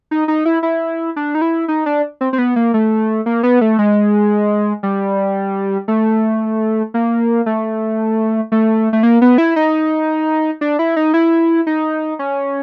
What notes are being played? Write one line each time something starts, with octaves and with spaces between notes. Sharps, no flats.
D#4
D#4
E4
E4
D4
D#4
E4
D#4
D4
C4
C4
B3
A#3
A3
A#3
B3
A3
G#3
G3
A3
A#3
A3
A3
A3
A#3
B3
E4
D#4
D4
E4
D#4
E4
D#4
C#4